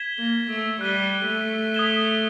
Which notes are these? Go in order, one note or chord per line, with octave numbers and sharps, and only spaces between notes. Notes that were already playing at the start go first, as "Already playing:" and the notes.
Already playing: G#6 B6 E7 G7
A#3
A3
G3 F#6 B6 D#7 G7
A3
D#6 G#6 B6 E7 G7